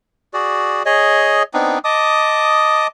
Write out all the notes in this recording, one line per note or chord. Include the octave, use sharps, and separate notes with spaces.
F#4 G#4 D5
G#4 C#5 D#5
B3 C4 D4 D#4
D#5 A5 D6 D#6